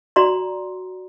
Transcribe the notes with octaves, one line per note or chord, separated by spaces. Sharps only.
F#4 D5 A#5 C6